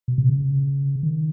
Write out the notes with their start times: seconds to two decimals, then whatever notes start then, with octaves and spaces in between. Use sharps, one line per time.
0.08 B2
0.18 C3
0.29 C#3
1.03 D#3